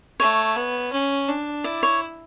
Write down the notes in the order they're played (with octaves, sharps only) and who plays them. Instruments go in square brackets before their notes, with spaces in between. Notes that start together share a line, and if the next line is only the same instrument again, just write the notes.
[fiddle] A3 [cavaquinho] C#5
[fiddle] B3
C#4
D4
[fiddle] E4 [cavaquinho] D5
[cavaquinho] C#5